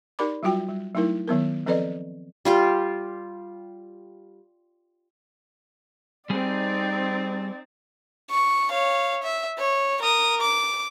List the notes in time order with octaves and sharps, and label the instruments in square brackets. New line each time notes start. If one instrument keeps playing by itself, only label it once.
[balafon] D#4 G4 A#4 D5 B5 D6
F#3 G3 F4 F#4 G5
G3
F#3 A3 D#4 E4 A#4
D#3 F#3 B3 A#4
F3 C4 A4 B4 D5 D#5
[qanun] G3 F4 G4
[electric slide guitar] G3 G#4 [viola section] C4 D#4 [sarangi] D5
[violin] C#6
C#5 F5
E5
C#5
A#4 D#6
D6